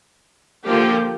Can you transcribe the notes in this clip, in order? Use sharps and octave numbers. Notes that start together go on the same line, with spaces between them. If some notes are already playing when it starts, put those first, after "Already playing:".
D3 F3 A#3 G4